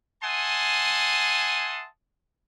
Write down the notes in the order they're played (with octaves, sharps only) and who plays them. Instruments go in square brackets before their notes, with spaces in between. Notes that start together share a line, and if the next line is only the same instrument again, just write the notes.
[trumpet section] E5 F#5 G#5 A5 C6 D#6